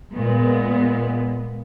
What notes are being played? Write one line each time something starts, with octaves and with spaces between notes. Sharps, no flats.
A#2 G#3 B3